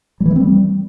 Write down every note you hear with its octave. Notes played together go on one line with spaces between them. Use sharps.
G3
E3
A3
C4
G3